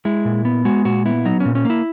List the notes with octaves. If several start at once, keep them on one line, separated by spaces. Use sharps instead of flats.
G#3 E4
A#2
B3
G#3 F#4
A#2 F#4
B3 E4
F#3 D#4
A#2 C#4
C#4
A#3 E4